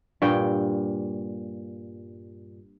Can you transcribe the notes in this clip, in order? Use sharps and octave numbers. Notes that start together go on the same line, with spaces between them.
G2 A#2 G5